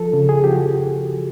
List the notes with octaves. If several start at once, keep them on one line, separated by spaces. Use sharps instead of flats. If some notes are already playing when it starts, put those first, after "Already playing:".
Already playing: F3 A4
C#3
G#4
F3 G4
F#4